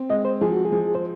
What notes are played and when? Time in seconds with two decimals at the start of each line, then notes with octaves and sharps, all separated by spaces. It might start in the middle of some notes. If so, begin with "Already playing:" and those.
Already playing: C4
0.09 G#3 D#5
0.25 C5
0.41 F3 G#4
0.52 F#4
0.65 G#4
0.72 F3
0.95 C5